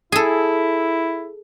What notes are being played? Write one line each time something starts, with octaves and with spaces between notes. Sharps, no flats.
E4 G#4 A4